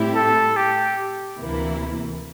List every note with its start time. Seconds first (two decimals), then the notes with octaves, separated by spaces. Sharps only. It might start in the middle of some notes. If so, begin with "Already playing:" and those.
Already playing: A2 G3 C4 E4 G4
0.15 A4
0.57 G4
1.40 D2 C3 E3 A#3 E4